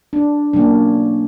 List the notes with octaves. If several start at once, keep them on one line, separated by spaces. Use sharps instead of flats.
D4
B2 F#3 A#3 C#4 D4